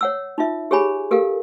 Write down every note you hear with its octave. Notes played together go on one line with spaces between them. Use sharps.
C#5 F#5 E6
D#4 F4 E5
G4 G#4 C#5 G#5 B5
G4 A4 A#4 F5